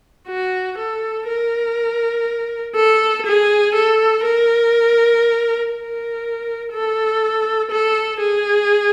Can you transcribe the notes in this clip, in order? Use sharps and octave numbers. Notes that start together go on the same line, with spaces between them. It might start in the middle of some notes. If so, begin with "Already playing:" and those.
F#4
A4
A#4
A4
G#4
A4
A#4
A#4
A4
A4
G#4